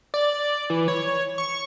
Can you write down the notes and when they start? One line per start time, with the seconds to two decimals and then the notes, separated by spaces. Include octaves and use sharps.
0.14 D5
0.70 E3
0.88 C#5
1.38 C#6